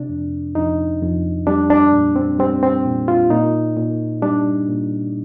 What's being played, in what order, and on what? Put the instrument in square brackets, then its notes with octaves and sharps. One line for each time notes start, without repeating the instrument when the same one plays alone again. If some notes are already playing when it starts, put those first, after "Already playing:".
Already playing: [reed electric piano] C3 D4
F2
F2 D#4
F2
G3 D4
D4
A#2
C4
G3 C4
C4
A#2
F4
A#2 D#4
A#2
G3 D4
A#2